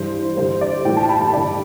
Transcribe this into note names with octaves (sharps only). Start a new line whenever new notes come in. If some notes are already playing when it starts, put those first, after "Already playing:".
Already playing: G2 E3 G3 C5
G2 D3 G3 C5
D5
A2 E3 G3 G5
A5
B5
A5
G2 D3 G3 D5